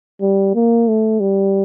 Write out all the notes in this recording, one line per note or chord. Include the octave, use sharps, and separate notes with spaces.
G3
A#3
A3
G3